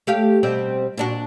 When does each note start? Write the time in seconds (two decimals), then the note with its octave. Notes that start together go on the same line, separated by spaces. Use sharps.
0.07 A3 G4 F5
0.43 B2 G3 C4
0.97 A#2 D4 F#4